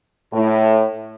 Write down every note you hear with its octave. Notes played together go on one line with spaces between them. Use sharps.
A2